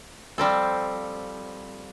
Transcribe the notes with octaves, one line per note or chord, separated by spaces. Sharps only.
F3 G3 C4 A4